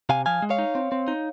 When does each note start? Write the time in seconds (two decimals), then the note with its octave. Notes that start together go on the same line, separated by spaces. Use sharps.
0.09 C3 F5 G#5
0.26 F3 F5 G#5
0.42 G#3
0.50 C#5 F5
0.59 D#4
0.75 C4
0.92 C4
1.08 D#4